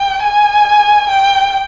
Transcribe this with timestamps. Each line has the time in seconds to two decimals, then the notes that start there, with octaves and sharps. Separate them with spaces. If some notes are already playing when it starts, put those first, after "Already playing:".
Already playing: G5
0.22 G#5
1.09 G5